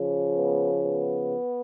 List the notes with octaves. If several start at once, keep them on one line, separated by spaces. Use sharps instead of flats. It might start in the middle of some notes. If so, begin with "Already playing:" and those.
Already playing: C#3 F3
B3
B3